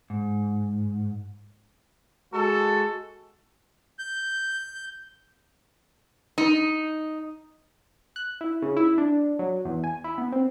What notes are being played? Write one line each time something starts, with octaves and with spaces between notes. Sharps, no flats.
G#2
G#3 F#4 A4
G6
D#4
F#6
E4
C#3
E4
D4
F#3
E2
G#5
E4
B3
C4